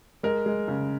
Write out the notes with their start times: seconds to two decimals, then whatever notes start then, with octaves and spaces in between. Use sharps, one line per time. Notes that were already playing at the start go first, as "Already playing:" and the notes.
0.23 G#3 A#4
0.46 G#3
0.68 C#3